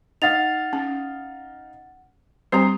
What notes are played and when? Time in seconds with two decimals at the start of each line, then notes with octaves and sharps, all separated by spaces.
0.22 D#4 F5 F#5 A6 F7
0.73 C#4
2.52 G3 C4 G4 C5 A#5 C7